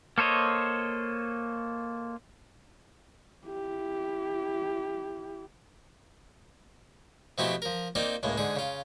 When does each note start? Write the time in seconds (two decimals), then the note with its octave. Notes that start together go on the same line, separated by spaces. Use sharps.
0.18 A#3 A4 C5 C#5 D#5
3.46 E4 G4
7.38 B2 F3 A3 C4 E4 G4
7.62 F3 A#4
7.95 A#3 C4 D#4 F4 D5
8.23 C#2 A2 G#3 A#3
8.38 G#2 D3 G#4
8.56 C#3 F4